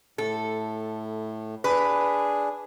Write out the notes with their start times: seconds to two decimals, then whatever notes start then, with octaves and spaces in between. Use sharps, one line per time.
0.18 A2 A4
1.64 D4 G#4 B4